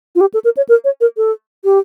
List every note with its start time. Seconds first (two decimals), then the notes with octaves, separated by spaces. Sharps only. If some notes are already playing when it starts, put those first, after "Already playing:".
0.15 F4
0.21 G4
0.34 A4
0.44 A#4
0.57 C#5
0.69 A#4
0.84 C#5
1.01 A#4
1.17 A4
1.64 G4